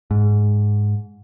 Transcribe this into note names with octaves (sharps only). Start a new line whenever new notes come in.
G#2